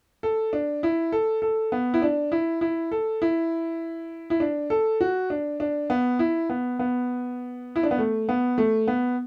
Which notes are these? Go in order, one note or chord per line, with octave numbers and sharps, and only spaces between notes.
A4
D4
E4
A4
A4
B3
E4
D4
E4
E4
A4
E4
E4
D4
A4
F#4
D4
D4
B3
E4
B3
B3
E4
D4
B3
A3
B3
A3
B3